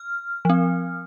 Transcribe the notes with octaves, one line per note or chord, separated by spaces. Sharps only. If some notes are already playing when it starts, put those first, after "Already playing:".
Already playing: F6
F3 C4